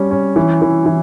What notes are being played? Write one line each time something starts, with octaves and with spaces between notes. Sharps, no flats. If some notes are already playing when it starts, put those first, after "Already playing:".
Already playing: G3 C#4
C#4
E3
E3
E3